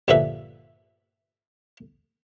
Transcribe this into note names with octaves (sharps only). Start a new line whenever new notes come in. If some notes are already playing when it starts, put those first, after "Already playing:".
A#1 G2 D3 F3 B4 E5